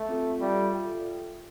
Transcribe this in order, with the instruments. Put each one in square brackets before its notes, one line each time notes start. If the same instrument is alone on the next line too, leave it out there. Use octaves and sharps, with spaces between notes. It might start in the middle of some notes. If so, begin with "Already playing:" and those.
Already playing: [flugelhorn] A3
[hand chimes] C4 F4 A4
[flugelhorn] G3 [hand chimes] F4 A4 E5 G5
[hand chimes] F4 A4 E5 G5